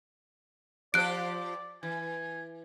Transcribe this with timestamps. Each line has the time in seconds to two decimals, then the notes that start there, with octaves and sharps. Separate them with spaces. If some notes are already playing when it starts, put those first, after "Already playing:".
0.94 F3 G4 C5 D5 F#6 D7
1.83 E3 G#5